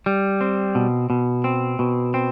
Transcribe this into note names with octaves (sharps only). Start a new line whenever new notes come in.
G3
C4
B2
B2
C4
B2
C4